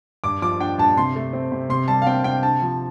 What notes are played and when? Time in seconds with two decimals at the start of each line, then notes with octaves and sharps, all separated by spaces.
0.24 G2 D6
0.42 F3 D6
0.60 D4 G5
0.78 G2 A5
0.97 C3 C6
1.15 A3
1.33 C4
1.52 C3
1.69 C3 C6
1.88 G3 A5
2.02 F5
2.06 C4 G5
2.24 C3 G5
2.43 D3 A5
2.62 F3